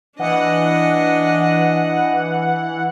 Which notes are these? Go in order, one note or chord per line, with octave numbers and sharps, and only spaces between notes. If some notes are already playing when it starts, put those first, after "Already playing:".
E3 D4 D#5 F#5